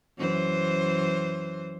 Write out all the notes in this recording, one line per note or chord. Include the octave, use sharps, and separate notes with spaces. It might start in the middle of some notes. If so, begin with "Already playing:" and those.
F#2 E3 C5